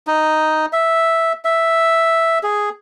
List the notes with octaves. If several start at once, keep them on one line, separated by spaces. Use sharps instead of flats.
D#4
E5
E5
G#4